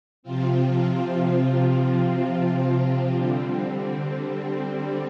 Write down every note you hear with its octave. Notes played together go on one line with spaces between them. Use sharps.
C3 F3 C4 F4
C3 F3 C4 F4
D3 G3 C4